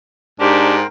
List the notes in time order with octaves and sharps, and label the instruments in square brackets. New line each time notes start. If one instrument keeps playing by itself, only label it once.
[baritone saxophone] G#2 [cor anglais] D4 [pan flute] G4 [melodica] A#4 C5 G5